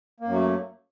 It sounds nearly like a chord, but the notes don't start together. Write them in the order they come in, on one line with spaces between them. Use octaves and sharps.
A#3 F#2 F#3 A3